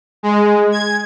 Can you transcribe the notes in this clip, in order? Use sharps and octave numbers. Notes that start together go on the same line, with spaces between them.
G#3
G#6